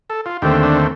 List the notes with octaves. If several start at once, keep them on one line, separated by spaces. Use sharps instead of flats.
A4
F4
D#2 D3 A3 C4 G4
D4